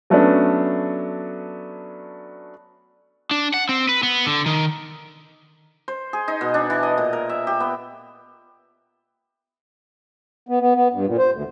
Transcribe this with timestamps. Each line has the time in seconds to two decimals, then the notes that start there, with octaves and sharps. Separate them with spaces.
0.10 F#3 A3 B3 C#4 D4
3.31 D4
3.54 F#5
3.69 C4
3.89 B4
4.03 B3
4.26 D3
4.46 D#3
5.88 C5
6.13 G#4
6.28 D#4
6.41 B2
6.54 D4
6.70 E3
6.83 D#5
6.98 A#2
7.13 A#4
7.29 E5
7.47 G4
7.60 B3
10.49 B3
10.60 B3
10.75 B3
10.93 G2
11.06 A#2
11.18 C5
11.31 D2